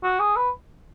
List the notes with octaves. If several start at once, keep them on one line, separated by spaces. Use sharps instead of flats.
F#4
G#4
B4